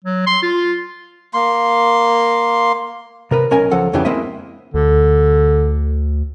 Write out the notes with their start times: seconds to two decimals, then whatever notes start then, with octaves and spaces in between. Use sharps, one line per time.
0.04 F#3
0.26 C6
0.42 F4
1.34 A#3 C6
3.31 C3 A#4 B4
3.51 B1 C#4 A#4 D#5 G#5
3.71 C#2 F3 A4 F#5
3.93 F2 C#3 E3 D4 G4
4.05 G#3 A#3 C4 E4 D#5 E5
4.74 D2 D3